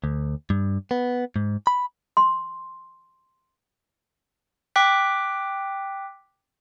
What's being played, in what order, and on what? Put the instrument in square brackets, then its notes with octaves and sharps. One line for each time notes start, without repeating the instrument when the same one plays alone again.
[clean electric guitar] D2
G2
B3
G#2
B5
[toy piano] C6
[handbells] G5 D6 F#6 B6